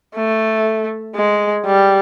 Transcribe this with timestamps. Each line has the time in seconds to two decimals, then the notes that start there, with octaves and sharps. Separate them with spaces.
0.15 A3
1.15 G#3
1.66 G3